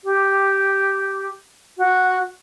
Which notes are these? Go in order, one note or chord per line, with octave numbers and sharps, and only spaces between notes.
G4
F#4